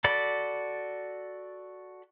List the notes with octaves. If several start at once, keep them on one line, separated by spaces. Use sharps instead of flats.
F#4 A4 D5 B5